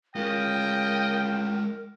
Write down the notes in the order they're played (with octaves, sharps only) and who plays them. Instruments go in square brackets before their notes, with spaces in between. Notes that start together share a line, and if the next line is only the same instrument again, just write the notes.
[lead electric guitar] G#3 F4 [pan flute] A#4 [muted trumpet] D#5 [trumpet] G5